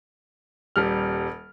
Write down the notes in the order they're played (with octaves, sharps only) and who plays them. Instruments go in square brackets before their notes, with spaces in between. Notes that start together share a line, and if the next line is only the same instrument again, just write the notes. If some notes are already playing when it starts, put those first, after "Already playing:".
[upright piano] D#1 G3 F6